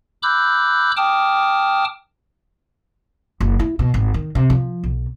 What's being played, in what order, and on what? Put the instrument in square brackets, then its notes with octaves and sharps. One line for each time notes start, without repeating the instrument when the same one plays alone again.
[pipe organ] B5 D6 E6 F#6 G6
G5 A5 D6 D#6 F6
[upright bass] F#1
E4
B2
G#1
D#3
C3
F3
B1